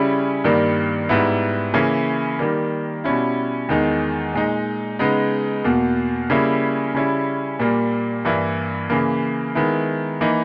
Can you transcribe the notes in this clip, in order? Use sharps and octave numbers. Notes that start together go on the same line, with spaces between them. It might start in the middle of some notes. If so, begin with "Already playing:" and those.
Already playing: C#3 G3 C#4 E4
G2 D#3 G3 A#3
G#2 G3 B3 E4
C#3 E3 A#3 C#4 E4
D#3 G3 A#3
B2 G3 C#4 E4
E2 D#3 G#3 D#4
A#2 G#3 D#4
C#3 G#3 B3 D#4
E2 B2 A#3
C#3 G3 A#3 C#4 E4
C#3 G3 C#4 E4
A#2 G3 A#3
G2 E3 A#3 E4
C#3 E3 A#3
D#3 G#3 B3 E4
E3 A#3 D#4